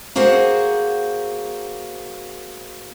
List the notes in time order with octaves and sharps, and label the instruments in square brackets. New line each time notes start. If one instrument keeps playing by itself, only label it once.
[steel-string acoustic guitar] A#3 F#4 G#4 C5 F#5